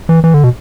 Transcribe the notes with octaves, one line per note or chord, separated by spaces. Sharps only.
E3
E3
D3
B2